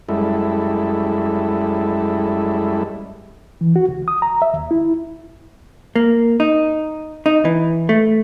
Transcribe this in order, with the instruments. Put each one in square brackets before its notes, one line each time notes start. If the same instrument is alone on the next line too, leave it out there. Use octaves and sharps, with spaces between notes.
[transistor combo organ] F#2 G3 G#3 E4 A4
[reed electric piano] E3
F#4
C#2
D#6
A#5
E5
D#2
E4
[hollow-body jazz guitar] A#3
D#4
D#4
E3
A3